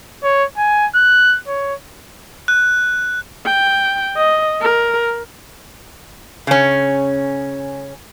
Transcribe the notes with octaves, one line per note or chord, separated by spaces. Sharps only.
C#5
G#5
F#6
C#5
F#6
G5
D#5
A#4
C#3 C#4